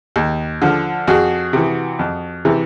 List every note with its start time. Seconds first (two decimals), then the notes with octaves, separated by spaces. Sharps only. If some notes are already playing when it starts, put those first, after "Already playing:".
0.16 D#2
0.62 D3 F3
1.07 F2 F#4 G#4
1.53 C3 E3
1.99 F2
2.45 C3 E3